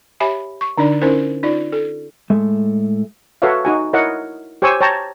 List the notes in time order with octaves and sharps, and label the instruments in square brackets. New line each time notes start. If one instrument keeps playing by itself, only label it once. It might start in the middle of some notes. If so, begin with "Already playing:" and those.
[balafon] G4 C#5 E5 G#5 B5
C#6
D3 D4 D#4 D5
C#4 D#4 E4 A#4 C5
D#4 F4 D5
A4
[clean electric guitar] A2 G#3 A4 E5
[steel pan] F#4 A4 B4 C#5 E5 F5
D#4 F#4 G#5
E4 A#4 C#5 D#5 F#5
G4 C5 C#5 G#5 C#6 E6
C#5 G5 A5 A#5